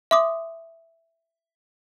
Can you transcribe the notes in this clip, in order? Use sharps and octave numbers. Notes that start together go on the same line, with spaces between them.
E5 C6 D6 D#6